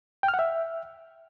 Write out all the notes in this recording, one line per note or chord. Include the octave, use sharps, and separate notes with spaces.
G5
F6
F#5
E5